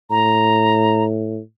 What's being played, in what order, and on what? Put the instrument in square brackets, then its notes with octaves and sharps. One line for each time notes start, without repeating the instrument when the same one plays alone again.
[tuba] A2 [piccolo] A#5